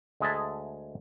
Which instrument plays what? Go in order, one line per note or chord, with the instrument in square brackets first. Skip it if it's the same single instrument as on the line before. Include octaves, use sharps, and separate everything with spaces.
[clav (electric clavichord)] D2 G#3 G#4 D#5 E5 A5